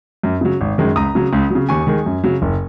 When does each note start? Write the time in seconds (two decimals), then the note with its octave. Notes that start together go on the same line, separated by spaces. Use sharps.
0.23 F#2
0.41 C#3 F#3
0.61 G#1
0.78 F#2 D#3 G#3
0.96 C#2 A#5 D#6
1.15 C#3 F#3
1.33 C#2
1.50 C#3 F#3
1.69 D#2 G#5 C#6
1.87 D#3 G#3
2.06 F#2
2.24 C#3 F#3
2.42 F#1